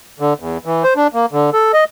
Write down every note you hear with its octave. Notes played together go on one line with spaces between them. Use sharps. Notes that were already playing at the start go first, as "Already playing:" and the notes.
D3
E2
E3
C5
D4
A#3
D3
A4
D#5